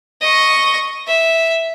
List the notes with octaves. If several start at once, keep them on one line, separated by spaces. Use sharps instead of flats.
D#5 C#6
E5